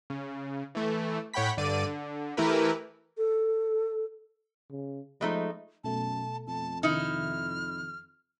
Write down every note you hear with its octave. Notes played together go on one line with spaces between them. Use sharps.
C#3
E3 A3
A2 C#5 F#5 G5 B5 B6
G2 D3 D5 D#7
D3
E3 A3 E4 G4 A#4 B4
A4
C#3
F3 G#3 A3 D#4
F#2 B2 A3 A5
F2 A5
C3 D#3 D#4 E4 F6